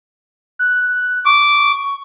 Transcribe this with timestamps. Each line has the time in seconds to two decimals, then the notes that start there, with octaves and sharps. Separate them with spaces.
0.59 F#6
1.26 C#6 D6